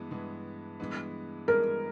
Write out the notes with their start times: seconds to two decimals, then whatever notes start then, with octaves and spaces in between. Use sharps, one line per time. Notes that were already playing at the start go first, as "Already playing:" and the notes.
Already playing: G2 E3 G#3 B3
0.11 G2 E3 G#3 B3
0.80 G2 E3 G#3 B3
1.48 G2 E3 G#3 B3 A#4